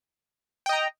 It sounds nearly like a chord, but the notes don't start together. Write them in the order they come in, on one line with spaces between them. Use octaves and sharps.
G5 D#5 A#5